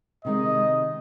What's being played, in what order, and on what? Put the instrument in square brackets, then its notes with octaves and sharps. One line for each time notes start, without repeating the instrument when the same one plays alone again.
[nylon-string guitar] C3 D#3 G#3 [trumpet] D#5